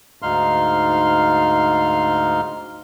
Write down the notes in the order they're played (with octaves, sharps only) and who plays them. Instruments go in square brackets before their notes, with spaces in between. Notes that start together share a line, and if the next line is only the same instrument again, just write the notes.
[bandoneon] D2 G#2 D#4 F5 C6 F6